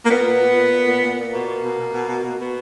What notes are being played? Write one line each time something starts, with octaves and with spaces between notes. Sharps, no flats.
A#3
A#2 B3
A#2
A#2
A#2
A#2
A#2
A#2
A#2
B2 A#3
B2
B2
B2
B2
B2
B2
B2